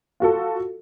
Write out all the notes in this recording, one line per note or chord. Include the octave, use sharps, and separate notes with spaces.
F4 F#4 A4